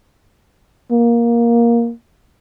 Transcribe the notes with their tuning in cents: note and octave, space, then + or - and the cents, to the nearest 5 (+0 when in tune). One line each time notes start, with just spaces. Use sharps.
A#3 +10